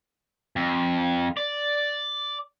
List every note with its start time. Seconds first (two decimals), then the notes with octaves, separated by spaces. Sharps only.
0.56 F2
1.37 D5